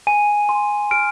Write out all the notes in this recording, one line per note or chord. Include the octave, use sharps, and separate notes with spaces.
G#5 D#7
C6
F6 D7